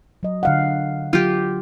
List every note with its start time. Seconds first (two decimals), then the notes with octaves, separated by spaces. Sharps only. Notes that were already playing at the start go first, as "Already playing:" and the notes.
0.23 F#3 D#5
0.43 D3 F5 F#5
1.13 F#3 F4 G4